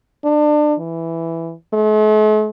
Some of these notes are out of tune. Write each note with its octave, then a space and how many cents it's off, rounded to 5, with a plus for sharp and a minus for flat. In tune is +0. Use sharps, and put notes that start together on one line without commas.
D4 +30
E3 +5
A3 -45